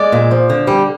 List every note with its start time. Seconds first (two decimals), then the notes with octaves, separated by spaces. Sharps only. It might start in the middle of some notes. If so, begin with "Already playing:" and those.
Already playing: G#3 D5
0.12 A#2
0.31 F3
0.50 D3
0.67 G3